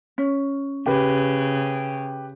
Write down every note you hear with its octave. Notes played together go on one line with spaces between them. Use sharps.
C#4
C#3 G4 B4